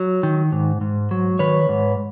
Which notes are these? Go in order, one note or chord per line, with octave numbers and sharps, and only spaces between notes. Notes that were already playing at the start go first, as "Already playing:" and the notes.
Already playing: F#3
D#3
G#2
G#2
F#3
D#3 B4 C#5
G#2